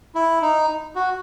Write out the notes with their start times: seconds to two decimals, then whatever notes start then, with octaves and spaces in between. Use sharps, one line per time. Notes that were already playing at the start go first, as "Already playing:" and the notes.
0.15 E4
0.42 D#4
0.95 F#4